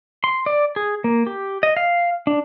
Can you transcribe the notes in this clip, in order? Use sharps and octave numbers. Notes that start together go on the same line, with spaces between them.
C6
D5
G#4
A#3
G4
D#5
F5
D4